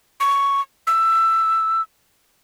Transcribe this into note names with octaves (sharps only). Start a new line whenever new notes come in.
C#6
E6